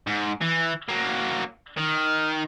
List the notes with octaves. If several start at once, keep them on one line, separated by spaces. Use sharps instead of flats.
G#2
E3
F#3 A#3
D#3